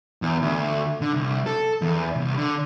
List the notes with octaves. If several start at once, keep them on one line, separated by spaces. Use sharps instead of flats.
E2
D2
D3
C2
A4
E2
C2
D3